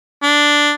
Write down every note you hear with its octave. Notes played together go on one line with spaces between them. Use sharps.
D4